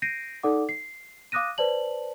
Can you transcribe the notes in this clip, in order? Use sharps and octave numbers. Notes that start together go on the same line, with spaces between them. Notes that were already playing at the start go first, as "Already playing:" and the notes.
G6 A#6 C7 D7 D#7
D#4 A4 D5 F#5 D6
C7
F5 D6 D#6 F#6 A#6 D#7
B4 C5 D5 A5 F#7